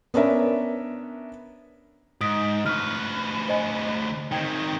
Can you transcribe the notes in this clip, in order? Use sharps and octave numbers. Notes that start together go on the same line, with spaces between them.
B3 C#4 D4 A#4 E5
G#2 D#6 B6 D7
D2 B4 C#6 F6
C5 D#5 G#5
D#3 C4 G5 G#6